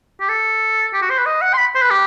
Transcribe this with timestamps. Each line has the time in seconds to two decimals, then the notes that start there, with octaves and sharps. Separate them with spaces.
0.21 G4
0.29 A4
0.94 G4
1.02 F#4
1.10 C5
1.18 B4
1.26 D#5
1.42 F#5
1.54 C6
1.58 B5
1.75 C5
1.82 B4
1.91 G4